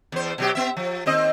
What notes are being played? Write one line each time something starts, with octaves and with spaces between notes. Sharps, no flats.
E2 C5
B2 F#3 G4
B3 E5
F3
D#2 C4 D#5